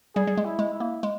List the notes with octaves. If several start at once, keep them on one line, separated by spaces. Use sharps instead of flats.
G3 G#4
G3
G#3
E4
G#3
E4
A#3
G#3